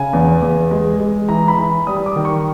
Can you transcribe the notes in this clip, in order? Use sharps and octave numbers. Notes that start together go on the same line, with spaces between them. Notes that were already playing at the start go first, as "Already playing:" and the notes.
Already playing: C#3 G#5
E2
E2
G#3
G#3
E3 A#5
B5
E3
G3 D#6
D#6
D6
D#3
C#6